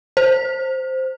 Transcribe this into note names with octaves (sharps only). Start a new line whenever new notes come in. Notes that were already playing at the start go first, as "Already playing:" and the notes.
C5